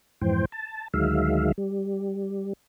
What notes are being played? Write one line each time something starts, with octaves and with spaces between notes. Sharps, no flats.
F2 G#2 E3 C5 G5
A5
D2 D#3 F#3 G#3 E5 F5
G3